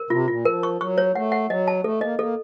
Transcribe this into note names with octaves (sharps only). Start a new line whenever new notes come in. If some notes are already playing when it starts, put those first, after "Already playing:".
Already playing: A#4
C3 F4
A#2 F4
F3 A#4
C#6
F#3 C#6
C#5
A3 F#5
F#5
F#3 D#5
A5
A3 A4
A#3 D#5
A#3 A4